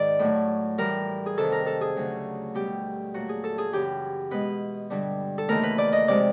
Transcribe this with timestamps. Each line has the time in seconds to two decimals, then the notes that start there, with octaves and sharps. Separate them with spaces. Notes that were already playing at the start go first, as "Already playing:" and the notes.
Already playing: G#2 D#3 D5
0.19 A2 F#3 A3
0.78 A2 E3 G3 A#4
1.26 G#4
1.37 F2 C3 D#3 A4
1.52 A#4
1.66 A4
1.81 G#4
1.96 D2 C#3 F#3 A3
2.54 B2 G3 G4
3.14 A#2 F#3 A3 F#4
3.29 G#4
3.44 A4
3.58 G#4
3.72 F#2 C#3 E3 G4
4.31 B2 G#3 B4
4.90 G2 D3 G3
5.38 A4
5.48 D#2 C#3 E3 A3 A#4
5.63 B4
5.78 D5
5.93 D#5
6.08 C3 F3 G#3 D5